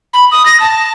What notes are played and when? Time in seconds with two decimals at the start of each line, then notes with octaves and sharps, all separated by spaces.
0.13 B5
0.31 D#6
0.46 A#6
0.60 A5